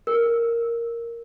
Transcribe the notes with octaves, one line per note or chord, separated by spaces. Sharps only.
A#4